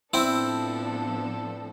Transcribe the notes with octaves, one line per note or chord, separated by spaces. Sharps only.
A2 F3 B3 C4 D4 E4 A4